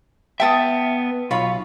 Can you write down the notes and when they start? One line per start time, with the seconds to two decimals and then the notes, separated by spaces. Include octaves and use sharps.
0.40 B3 E5 G5 A5 D#6
1.31 B1 F4 C#5 B5